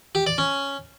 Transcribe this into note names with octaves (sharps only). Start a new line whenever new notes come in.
G4
D5
C#4